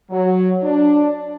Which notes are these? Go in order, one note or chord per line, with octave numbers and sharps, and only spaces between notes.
F#3
D4